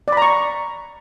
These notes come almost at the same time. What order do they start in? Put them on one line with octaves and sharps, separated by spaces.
D5 B5 A#5 C#6